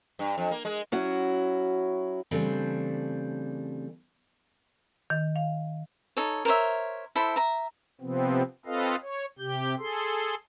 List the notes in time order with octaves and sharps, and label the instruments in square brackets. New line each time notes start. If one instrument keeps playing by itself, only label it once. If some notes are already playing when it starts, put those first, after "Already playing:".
[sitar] G2
F2
A#3
G#3
[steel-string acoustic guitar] F#3 C#4 E4 F#4
C#3 E3 G3 A3 C4 D4
[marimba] D#3
F5
[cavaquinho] D#4 A4 C#5
A#4 C5 C#5 E5
E4 A4 C5 B5
E5 A#5
[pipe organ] C3 F3 B3 C4
C4 F4 A4 B4 D#5 F5
C#5
C3 G4 G6
G#4 A4 C6